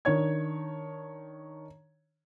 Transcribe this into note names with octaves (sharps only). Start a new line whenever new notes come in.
D#3 D4 C#5 G#6